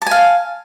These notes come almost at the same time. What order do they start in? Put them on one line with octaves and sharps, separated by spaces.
A5 G#5 F5